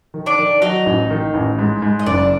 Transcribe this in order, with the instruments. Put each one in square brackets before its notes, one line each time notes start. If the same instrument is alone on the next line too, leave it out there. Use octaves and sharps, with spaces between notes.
[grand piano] D#3
[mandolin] D4 D5
[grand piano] D#3
[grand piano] F#3 [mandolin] D#4 D#5
[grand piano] A1
D#3
A1
G#2
G#2
[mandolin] D#5
[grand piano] F#1 [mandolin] D4 D5